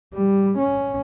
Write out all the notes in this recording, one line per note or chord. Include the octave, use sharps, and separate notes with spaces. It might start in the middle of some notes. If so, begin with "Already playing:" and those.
G3
C#4